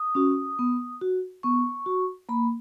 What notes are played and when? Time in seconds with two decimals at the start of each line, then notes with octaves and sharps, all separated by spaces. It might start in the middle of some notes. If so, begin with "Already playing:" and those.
Already playing: D#6
0.15 C#4 F#4
0.59 B3
1.01 F#4
1.43 B3 C#6
1.86 F#4
2.29 A#3 B5